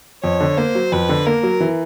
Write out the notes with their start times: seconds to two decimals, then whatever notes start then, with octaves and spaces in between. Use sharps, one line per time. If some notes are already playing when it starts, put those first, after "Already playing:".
0.23 F2 C#5
0.40 D3
0.58 A#3 C5
0.75 F#3
0.92 F2 B4
1.09 D3
1.26 A#3 A#4
1.43 F#3
1.60 E3